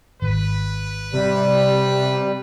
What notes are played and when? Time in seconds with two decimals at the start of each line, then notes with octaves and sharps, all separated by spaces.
0.22 G#1 B4
1.13 C3 G3